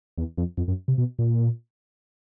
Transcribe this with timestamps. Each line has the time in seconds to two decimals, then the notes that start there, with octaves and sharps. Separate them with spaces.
0.18 E2
0.38 F2
0.57 F2
0.68 F#2
0.88 C3
0.98 B2
1.19 A#2